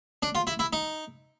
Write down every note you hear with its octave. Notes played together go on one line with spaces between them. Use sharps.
D4
F4
E4
E4
D#4